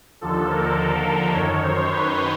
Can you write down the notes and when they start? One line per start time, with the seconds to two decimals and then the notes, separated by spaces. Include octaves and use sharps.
0.21 D#2 D3 F3 A4
0.50 A#4
0.78 A#4
1.06 A#4
1.34 F#2 D#3 C#5
1.63 C5
1.91 B4